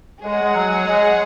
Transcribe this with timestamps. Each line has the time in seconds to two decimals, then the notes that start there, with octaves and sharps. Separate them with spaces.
0.23 G#3 G#4 C#5 F#5
0.42 G#3
0.54 F#3
0.86 G#3